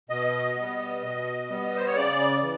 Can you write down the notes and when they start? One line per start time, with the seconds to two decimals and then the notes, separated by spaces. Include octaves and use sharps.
0.10 B2 D#5
0.56 G3 B3
1.03 B2
1.49 G3 B3
1.77 C5
1.87 C#5
1.95 C#3 D5
2.42 E3